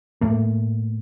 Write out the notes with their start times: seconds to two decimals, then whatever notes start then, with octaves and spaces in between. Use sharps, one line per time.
0.21 A2 A3 A#3